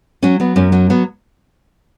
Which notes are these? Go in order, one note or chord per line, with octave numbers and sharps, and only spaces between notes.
F#3 C#4
F#3 B3
F#2 C#4
F#3 C#4
F#3 B3